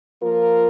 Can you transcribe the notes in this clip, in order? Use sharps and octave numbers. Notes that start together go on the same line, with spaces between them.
F3 A#3 F4 A#4